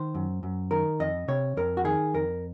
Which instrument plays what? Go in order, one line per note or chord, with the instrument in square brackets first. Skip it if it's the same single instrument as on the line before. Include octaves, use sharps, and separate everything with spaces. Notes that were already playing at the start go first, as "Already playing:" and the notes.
Already playing: [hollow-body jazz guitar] D#3 C5
F#2
F#2
D#3 A#4
F2 D#5
C3 C#5
F2 A#4
F#4
D#3 G#4
F2 A#4